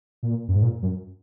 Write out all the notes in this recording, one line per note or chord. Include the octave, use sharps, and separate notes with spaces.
A#2
F#2
G#2
A#2
F#2